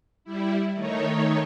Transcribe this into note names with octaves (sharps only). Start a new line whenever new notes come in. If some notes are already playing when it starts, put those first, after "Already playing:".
G3 E4
D#3 A3 D#4 C#5